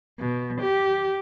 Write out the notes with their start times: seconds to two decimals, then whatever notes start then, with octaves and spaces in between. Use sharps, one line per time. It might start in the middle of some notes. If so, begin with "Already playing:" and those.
0.20 B2
0.62 G4